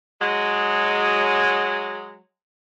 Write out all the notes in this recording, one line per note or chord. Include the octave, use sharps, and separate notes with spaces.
F#3 G#3